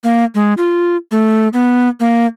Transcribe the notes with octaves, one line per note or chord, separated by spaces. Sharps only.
A#3
G#3
F4
A3
B3
A#3